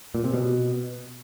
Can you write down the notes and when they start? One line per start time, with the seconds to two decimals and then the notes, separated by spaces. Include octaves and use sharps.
0.15 A#2
0.24 C3
0.33 B2